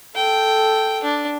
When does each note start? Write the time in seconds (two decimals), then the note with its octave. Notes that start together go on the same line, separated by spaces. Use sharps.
0.16 A4 G5
1.04 D4